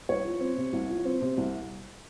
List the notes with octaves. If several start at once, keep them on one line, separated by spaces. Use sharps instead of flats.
C2 C#5
F3
C4
C3
C2
F3
C4
C3
C2